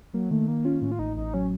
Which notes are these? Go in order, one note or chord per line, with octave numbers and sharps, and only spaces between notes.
F#3 A#3
D#3 A3
D#3 A#3
C#4 F4
A2 C#4
F4
A1 D#4
A1 D#4
F#3 C#4